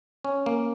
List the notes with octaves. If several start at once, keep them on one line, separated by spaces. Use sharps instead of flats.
C#4
A#3